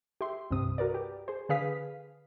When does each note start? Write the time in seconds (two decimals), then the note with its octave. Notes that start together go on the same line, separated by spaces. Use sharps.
0.21 G4 E5 C6
0.51 C2 G2 C3 D#6
0.78 F#4 A#4 B4 D5
0.94 G4
1.28 G#4 C5
1.49 D3 G#4 B4 F5 D#6 B6